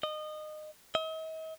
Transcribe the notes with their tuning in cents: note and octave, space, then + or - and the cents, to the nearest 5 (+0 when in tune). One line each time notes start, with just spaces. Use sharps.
D#5 -25
D#5 +45